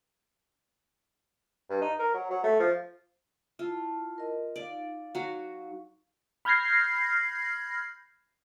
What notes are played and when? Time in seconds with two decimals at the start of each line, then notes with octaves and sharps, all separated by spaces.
1.70 G2
1.82 D#4
1.99 A#4
2.14 F#3
2.31 F#3
2.44 A3
2.60 F3
3.59 E4 F4 A5
4.18 A#4 D#5
4.56 D#4 D5 F5
5.15 F#3 F#4
6.45 B5 F6 G6 G#6 A#6 C7